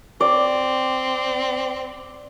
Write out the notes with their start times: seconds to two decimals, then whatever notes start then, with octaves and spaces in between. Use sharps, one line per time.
0.21 C4 D5